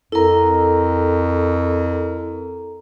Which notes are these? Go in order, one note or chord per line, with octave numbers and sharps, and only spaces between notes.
F2 E4 A4 A#4 A#5